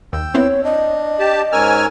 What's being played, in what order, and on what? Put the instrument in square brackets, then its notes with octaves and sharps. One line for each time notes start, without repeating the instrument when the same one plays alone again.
[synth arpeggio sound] D#2 [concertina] G5 E6
[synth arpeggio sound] B3 C4 E4 [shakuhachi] C#5
[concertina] D4 [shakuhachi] D#5
[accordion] G4 A5
[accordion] G#2 G#5 F6 [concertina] C#4 A#4 E6